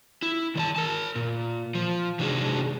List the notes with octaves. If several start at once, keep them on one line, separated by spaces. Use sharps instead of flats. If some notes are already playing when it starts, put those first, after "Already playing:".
E4
D#3 D5 A5
A#4 A5
A#2
F3
C3 D#3 G#3 D4 F#4 G#4